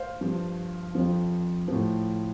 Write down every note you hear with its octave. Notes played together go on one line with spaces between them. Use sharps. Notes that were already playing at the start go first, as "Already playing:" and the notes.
Already playing: C5 F5
G2 F3
F2 F3
A2 F3